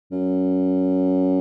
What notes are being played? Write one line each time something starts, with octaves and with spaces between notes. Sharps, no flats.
F#2